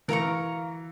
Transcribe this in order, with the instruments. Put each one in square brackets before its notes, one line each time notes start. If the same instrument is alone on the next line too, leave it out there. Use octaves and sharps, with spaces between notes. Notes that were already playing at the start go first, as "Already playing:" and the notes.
[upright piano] E3 [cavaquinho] A#4 F5 A#5 C#6